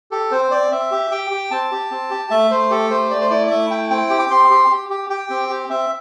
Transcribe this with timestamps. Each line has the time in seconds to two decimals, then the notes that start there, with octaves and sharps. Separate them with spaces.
0.11 G4 A4
0.31 C4 C5
0.51 C4 D5
0.71 C4 E5
0.91 G4
1.11 G4 G5
1.31 G4
1.51 C4 A5
1.71 G4
1.91 C4
2.10 G4
2.30 A3 E5
2.51 A3 C5
2.70 G4 A4
2.90 A3 C5
3.11 A3 D5
3.21 C5
3.30 E4 D5
3.47 D5
3.50 A3 E5
3.70 E4 G5
3.90 C4 G5
4.10 G4
4.19 D6
4.30 C4 C6
4.50 G4
4.70 G4
4.90 G4
5.10 G4 G5
5.30 C4
5.50 G4
5.70 C4 E5